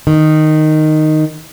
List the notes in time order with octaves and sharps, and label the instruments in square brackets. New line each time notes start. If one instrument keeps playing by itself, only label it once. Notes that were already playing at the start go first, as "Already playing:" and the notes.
[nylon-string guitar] D#3